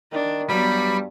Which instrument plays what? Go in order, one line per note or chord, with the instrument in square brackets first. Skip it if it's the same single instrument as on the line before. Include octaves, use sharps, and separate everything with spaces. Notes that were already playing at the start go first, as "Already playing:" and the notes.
[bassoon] D#3 [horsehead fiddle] D4
[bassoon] G2 [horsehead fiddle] F#3 B3 [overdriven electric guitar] G3 [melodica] B5